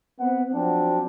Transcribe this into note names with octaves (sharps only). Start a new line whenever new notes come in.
B3 C4 B4 F#5
F3 F#3 C4 D4